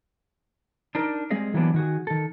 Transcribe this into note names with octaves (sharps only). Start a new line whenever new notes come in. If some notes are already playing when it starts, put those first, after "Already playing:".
D4 D#4 A#4
G3 G#3 C4 G#4 D#5 F5
E3 F#3 G3 A#3 B3 D4
D#3 F#4 G#4
D#3 A4